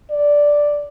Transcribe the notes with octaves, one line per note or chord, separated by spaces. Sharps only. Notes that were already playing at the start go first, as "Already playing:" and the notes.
D5